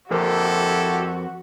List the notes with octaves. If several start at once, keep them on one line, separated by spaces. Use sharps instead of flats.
F2 E4 F#4 G4 A4 A#4 C5